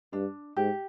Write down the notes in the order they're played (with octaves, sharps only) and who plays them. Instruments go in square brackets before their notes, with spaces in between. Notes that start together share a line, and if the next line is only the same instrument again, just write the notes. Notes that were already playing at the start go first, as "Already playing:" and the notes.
[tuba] G2 [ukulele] D4
[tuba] G#2 [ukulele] G4